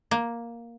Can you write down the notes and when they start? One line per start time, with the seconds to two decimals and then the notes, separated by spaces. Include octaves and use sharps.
0.11 A#3